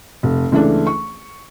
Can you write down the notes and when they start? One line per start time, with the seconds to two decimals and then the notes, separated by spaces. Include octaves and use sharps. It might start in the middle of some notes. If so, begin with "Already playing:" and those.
0.23 F1
0.52 C#2 E3 A3 D4
0.87 C#6